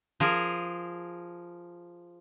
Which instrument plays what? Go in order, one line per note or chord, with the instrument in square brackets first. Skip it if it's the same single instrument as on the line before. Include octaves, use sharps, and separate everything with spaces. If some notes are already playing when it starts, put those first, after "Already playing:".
[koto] F3 G#4 A#4